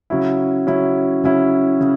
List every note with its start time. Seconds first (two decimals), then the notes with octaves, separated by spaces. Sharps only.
0.10 C#3 F#3 C#4 E4
0.67 C#3 F#3 C#4 E4
1.24 C#3 F#3 C#4 E4
1.81 C#3